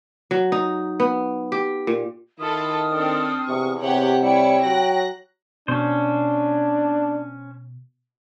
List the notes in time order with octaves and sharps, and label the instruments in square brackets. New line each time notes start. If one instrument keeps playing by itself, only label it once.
[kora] F#3
D#4
B3
G4
A#2
[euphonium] D#3 [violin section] E4 F4 A4 [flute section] D#6 F6
[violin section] C4 D4 A4
[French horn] E2 [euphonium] C3 [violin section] C#6
[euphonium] C3 [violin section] G4 C#5 F#5
[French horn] G3 [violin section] E4 C#5 C#7 [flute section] G5
[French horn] F#3 [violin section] F#6 A#6
[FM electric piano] B2 [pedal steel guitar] C#4 C5 [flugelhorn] D4